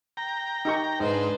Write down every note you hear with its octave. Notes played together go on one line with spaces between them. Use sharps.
G5 A#5
D#4 G4 C#6
G#2 D4 D#4 B4 C5